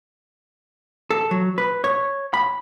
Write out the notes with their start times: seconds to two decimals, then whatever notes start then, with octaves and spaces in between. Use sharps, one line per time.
1.10 A4
1.31 F#3
1.58 B4
1.84 C#5
2.34 B5